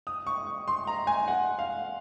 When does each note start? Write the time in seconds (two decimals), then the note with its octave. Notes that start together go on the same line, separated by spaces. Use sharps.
0.07 D#6
0.27 C#6
0.68 C6
0.87 A#5
1.07 G#5
1.28 F#5
1.59 F5